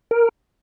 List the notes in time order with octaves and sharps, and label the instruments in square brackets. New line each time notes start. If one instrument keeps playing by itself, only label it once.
[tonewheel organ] A#4